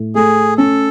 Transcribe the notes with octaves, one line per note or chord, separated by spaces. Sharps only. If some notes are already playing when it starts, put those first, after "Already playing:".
Already playing: A2
A3 G#4
C#4 A4